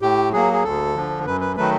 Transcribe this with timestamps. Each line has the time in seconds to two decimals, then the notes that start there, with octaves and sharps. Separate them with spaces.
0.02 A2 G4
0.33 F#3 A#3 G#4
0.53 G#4
0.64 D2 A4
0.95 D3 F3
1.25 F#2 B4
1.41 B4
1.56 D#3 F#3 A3 B4